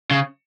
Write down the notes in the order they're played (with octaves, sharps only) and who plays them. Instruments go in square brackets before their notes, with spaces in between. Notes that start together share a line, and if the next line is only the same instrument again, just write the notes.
[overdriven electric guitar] C#3